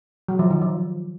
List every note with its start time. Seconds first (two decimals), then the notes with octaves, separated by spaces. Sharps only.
0.28 F#3
0.39 F3
0.50 D#3
0.61 F3